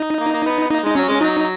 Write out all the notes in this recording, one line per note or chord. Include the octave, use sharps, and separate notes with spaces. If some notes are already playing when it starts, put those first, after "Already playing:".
Already playing: D#4
A#3
A#3
B3
A#3 D#4
G#3 D#4
F#3 C#4
G#3
F#3 D#4